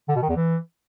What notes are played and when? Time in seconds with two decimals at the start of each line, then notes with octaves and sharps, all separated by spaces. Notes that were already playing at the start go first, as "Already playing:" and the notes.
0.09 D3
0.15 B2
0.22 D#3
0.29 E2
0.36 E3